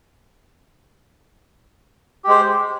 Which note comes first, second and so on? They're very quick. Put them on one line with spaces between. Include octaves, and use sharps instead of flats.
G4 G#3 C5